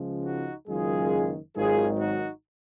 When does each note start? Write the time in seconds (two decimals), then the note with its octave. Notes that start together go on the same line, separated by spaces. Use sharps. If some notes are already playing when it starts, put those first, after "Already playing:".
Already playing: C#2 C#3 F3 G#3
0.24 D#4 F#4
0.68 F#1 F#2 D#3 G#3 F4 G#4
1.56 G#1 G#2 D#3 F#3 F4 G#4
2.00 D#4 F#4